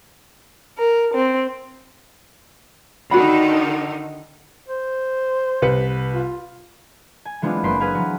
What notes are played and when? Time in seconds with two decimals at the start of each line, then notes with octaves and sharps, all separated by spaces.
0.77 A#4
1.14 C4
3.11 D3 D#3 D#4 F#4 F#5 B5
4.68 C5
5.62 C2 B4 C#7
6.14 F4
7.25 G#5
7.42 E3 G#3 B3 C4 D4 F4
7.63 F#1 A#3 B4 C5 C6 D7
7.80 G#4 B4 F5 G#5 C6
7.95 E3 F#3